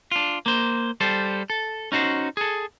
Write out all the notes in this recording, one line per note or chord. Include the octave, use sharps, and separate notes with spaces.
D4 F4
A#3 C5
G3 A4 C5
A4
C#4 D#4 F#4 C5
G#4 A4